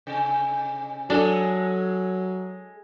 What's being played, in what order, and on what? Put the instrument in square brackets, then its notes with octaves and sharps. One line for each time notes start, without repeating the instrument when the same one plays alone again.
[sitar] C3
[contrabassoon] F#3 [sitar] G#3 G#4 A4 [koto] D4